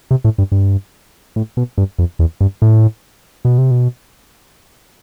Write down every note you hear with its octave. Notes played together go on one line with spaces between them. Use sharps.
C3
A2
G2
G2
A2
B2
G2
F2
E2
G2
A2
B2
C3
B2